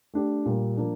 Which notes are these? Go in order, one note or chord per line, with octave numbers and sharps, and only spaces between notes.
A3 D4 G4
A#2 G3 A#3
F3 A#3 D4